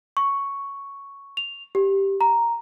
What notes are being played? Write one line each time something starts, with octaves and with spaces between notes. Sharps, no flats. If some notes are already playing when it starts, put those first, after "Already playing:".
C#6
F7
G4
A#5